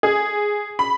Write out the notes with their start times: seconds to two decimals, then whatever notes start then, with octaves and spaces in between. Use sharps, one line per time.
0.03 G#4
0.79 B5